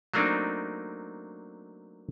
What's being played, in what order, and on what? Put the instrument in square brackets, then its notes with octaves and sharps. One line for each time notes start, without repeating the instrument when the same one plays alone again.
[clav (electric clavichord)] F#3 A3 A#3 C4 D4 D#4